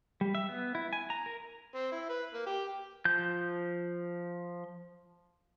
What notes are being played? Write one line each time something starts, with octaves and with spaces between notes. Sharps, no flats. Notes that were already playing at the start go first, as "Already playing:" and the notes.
G3
E5
B3
E4
G#5
A#5
A#4
C4
E4
B4
A#3
G4
F3 G6